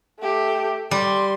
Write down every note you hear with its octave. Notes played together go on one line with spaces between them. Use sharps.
A3 G4
G3 C6